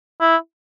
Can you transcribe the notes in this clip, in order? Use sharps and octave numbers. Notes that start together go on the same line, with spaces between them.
E4